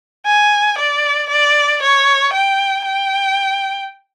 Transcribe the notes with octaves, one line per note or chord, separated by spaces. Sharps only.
G#5
D5
D5
C#5
G5
G5